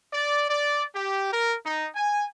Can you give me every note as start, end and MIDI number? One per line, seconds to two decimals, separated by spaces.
0.13 0.48 74
0.50 0.85 74
0.94 1.31 67
1.32 1.55 70
1.66 1.88 63
1.96 2.26 80